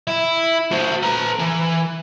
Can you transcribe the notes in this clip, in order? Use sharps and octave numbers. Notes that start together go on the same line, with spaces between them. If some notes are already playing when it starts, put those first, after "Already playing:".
E4
F#4 C5
B4 A#5
E3